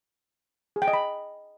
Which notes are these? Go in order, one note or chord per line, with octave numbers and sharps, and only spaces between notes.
G#4
G5
D#5
B5